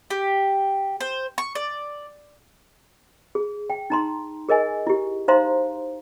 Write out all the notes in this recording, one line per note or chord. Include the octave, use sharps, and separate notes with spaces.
G4
C5
C#6
D5
G#4
G5
D#4 A#5 C6
G#4 A#4 D#5 G#5
E4 G4
D#4 C5 F5 A#5 C6